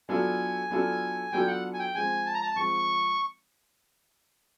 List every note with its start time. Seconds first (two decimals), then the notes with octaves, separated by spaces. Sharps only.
0.09 F#3 B3 D4 F4 A4 G#5
0.70 F#3 B3 D4 F4 A4
1.32 F#3 B3 D4 F4 A4 G5
1.47 F#5
1.73 G#5
1.79 G5
1.95 F3 G#3 C4 G#5
2.26 A5
2.34 A#5
2.43 A5
2.56 F3 G#3 C4 C#6